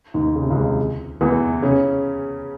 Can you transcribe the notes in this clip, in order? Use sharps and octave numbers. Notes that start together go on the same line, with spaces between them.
D#2 D#3
C#3
C3
C#2 C#3
E2 E3
C#3 C#4